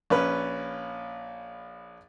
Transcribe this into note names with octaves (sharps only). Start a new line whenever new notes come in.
A#1 C#4 B4